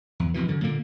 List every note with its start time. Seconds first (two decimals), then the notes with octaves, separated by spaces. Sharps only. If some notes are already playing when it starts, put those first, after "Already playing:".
0.20 E2
0.34 E1 F2 B2 E3
0.48 F#2 D3
0.64 A#2 D3 A#3